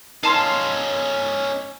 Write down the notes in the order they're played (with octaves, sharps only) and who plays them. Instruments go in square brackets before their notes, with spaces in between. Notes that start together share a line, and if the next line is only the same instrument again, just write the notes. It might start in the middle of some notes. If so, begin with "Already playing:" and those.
[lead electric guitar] C#4 D#4 [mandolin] F5 A5 C6